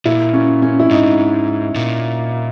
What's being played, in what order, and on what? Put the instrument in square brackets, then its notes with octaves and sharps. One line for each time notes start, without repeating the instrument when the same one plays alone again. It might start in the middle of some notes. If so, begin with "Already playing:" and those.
[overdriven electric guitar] A#2 [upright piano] E4
[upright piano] C#4
C#4
E4
[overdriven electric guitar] G#2 [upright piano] D#4
[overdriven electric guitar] A#2